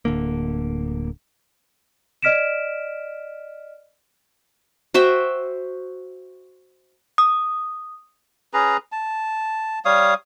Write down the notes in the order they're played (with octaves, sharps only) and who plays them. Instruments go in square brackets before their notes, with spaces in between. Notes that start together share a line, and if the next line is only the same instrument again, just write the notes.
[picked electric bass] D1 D3 A#3
[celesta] D5 D#5 F6 B6 D7 E7
[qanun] F#4 C5 E5 G5
[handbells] D#6
[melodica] C#4 G#4 B4 A#5
A5
G3 C#5 F5 D#6